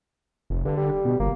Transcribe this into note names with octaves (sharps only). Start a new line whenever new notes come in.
F1
G2 D3
G3
B2
G1 A#3